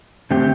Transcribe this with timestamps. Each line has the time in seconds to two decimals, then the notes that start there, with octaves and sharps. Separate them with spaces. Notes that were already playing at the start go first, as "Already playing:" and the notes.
0.31 D3 A3 C4 G4